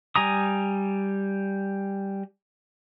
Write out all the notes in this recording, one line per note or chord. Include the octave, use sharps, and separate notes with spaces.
G3 G#5 A#5 D#6